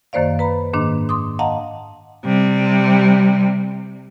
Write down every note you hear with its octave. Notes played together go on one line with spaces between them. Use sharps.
F#2 D#3 A#3 C5 D5 F5
B4 A#5 B5
G#2 D#3 A#3 D4 D6
C6 D6 D#6
D#5 F5 F#5 A5 A#5
C3 G3